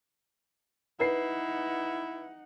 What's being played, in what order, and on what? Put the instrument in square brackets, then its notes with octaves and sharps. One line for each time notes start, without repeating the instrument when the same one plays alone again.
[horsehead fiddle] D#4 F#5 [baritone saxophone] E4 [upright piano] B4 C7